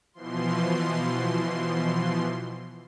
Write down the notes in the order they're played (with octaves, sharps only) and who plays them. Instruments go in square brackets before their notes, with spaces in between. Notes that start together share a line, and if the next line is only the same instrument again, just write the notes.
[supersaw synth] B2 E3 F3 C6